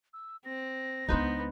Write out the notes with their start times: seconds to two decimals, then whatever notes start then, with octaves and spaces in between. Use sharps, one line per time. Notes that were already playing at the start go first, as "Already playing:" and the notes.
0.13 E6
0.45 C4 A#6
1.08 C#2 B3 D4 D#4 B4 C5